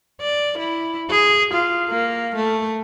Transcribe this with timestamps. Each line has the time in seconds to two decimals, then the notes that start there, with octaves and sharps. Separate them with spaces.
0.21 D5
0.59 E4
1.10 G#4
1.54 F4
1.90 A#3
2.36 A3